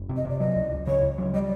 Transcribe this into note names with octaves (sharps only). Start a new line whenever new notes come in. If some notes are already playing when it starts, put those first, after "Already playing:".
Already playing: F#1
C3
D#5
C3 D5
F#3 D#5
C#2
C#2
C#3 C#5
C#2
F#3
G3 D#5
D5